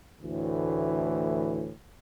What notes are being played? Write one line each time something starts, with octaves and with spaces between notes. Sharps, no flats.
D2 A2 E3